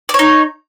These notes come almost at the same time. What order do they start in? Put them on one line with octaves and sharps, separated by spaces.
D5 C#5 D#4